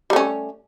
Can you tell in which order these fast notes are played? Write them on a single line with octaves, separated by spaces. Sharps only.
G3 A3 C#4